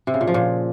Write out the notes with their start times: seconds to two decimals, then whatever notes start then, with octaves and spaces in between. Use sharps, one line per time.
0.07 C3
0.14 C#3
0.21 A#2
0.27 F3
0.34 A#2